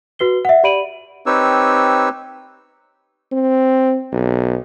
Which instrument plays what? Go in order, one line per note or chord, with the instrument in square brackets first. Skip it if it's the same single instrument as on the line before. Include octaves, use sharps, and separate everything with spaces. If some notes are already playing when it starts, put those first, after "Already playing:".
[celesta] F#4 B4 C7 G7
E5 F#5
G4 D5 B5 D7 D#7 F#7
[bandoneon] C4 D#4 G4 B4 C#5 E6
[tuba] C4
B1